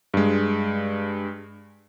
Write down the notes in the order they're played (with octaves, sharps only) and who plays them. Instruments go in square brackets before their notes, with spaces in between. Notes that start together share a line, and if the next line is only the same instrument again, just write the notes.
[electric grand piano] G2 G#3